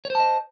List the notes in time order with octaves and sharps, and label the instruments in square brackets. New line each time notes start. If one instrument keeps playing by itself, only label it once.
[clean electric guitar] C#5
C5
A5
D#5